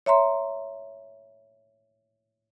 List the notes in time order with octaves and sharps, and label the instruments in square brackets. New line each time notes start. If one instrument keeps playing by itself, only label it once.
[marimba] C#5 E5 A#5 C6